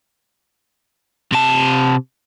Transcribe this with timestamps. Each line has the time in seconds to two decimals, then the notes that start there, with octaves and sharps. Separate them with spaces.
1.32 C3 A5